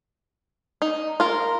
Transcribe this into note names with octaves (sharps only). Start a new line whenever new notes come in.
D#4
F4 A#4